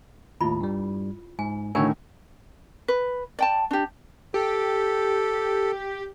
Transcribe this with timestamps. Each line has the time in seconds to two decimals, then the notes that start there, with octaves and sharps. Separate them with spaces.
0.41 D#2 A2 E4 F4 B5
0.61 G2 G3
1.39 G#2 G#5
1.75 A2 D3 D#3 F#4 A#4 C#5 E5 G#5
2.88 B4
3.39 D5 G5 A5
3.71 D4 G4
4.34 G4 A4